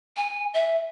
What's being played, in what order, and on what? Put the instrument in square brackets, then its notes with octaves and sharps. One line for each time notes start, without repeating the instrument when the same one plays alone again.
[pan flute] G#5
E5